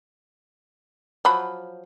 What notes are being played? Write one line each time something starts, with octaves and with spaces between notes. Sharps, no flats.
F3 F#3 B5